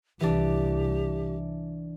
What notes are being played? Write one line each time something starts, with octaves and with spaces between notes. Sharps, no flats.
C2 E3 D4 G4